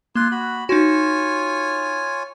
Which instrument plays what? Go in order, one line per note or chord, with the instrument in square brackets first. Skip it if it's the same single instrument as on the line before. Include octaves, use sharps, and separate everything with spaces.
[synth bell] A#3 F#6 [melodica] F4 C6
[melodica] F#4 B5
[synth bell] D#4 F#4 [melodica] F4 C#5 G#5